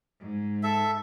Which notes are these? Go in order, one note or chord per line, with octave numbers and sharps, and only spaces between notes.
G#2
A4 E5